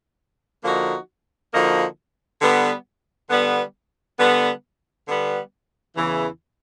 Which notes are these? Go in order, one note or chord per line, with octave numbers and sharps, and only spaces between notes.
D3 F3 A#3 D#4 F#4
D3 F3 A#3 D#4 F#4
D3 G3 B3
D3 G3 B3
D3 G3 B3
D3 G3 B3
E2 C#3 E3